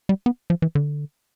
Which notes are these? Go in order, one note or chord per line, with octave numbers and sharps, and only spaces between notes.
G3
B3
F3
E3
D3